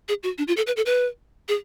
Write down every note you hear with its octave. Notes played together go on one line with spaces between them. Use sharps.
G#4
F#4
D4
F4
A4
B4
A4
B4
G#4